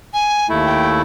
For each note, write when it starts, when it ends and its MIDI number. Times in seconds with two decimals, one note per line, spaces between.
0.13 0.46 80
0.49 1.02 39
0.49 1.02 57
0.49 1.02 64
0.66 0.90 79